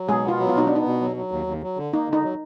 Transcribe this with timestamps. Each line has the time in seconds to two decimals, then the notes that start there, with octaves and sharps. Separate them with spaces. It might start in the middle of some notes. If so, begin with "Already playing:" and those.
Already playing: F#3
0.08 B2 G#3 G#4
0.24 B3 F4
0.40 F#3
0.49 F4
0.55 B2 D#4
0.67 B3 D4
0.76 D#4
0.85 B2
1.01 F#3
1.16 F#3
1.32 D#2
1.47 D#2
1.63 F#3
1.77 D3
1.93 A#3 D#4
2.08 D3 D#4
2.23 F#3